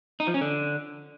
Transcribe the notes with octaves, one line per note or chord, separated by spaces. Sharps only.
D#4
F3
C#4
D3